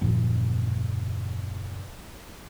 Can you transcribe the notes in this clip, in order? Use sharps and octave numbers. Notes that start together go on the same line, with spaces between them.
F#1 D#2 A#2 F3